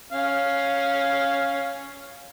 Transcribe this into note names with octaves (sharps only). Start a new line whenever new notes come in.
C#4 F5